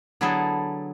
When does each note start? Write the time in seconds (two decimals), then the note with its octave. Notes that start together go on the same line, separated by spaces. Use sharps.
0.21 D3 F#3 B3 E4 G#4 A4